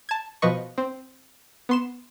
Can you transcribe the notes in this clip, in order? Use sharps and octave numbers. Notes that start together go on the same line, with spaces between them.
A5 G#6
B2 F3 B4 D#5 C#6
C4
B3 C6 E7